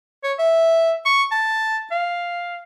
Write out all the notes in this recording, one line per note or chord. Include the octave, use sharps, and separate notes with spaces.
C#5
E5
C#6
A5
F5